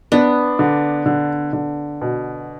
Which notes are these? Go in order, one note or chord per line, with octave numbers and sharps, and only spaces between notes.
B3 D4
D3
D3
D3
B2